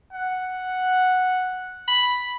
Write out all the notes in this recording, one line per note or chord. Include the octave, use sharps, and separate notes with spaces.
F#5
B5